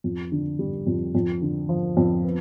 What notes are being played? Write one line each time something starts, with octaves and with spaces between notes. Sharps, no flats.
F2
D3
G3
F2
F2
D3
F3
F2
B3